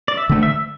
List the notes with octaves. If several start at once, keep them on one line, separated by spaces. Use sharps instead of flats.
D5
E5
D3 A3
E5